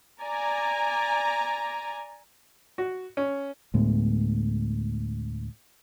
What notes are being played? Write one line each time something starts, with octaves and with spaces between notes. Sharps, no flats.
D5 G#5 A#5
F#4
C#4
D2 A2 G#3 B3